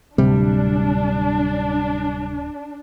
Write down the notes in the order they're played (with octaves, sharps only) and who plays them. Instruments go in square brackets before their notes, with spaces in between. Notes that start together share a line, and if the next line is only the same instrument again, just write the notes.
[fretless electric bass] D1 [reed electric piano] C3 [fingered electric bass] G3 [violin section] D4